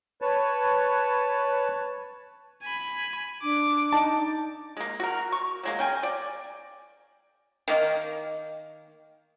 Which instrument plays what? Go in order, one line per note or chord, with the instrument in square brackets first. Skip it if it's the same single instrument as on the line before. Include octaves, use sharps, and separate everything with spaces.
[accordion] B4 C#5 A5
[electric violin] G#5 B5
[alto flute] D4 [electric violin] D6
[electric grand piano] D#4 A5
[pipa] G#3 A#3
F#4 A#4
C#6
F#3 G#3 A#3
C#4 G5 G#5
D5
D#3 A#3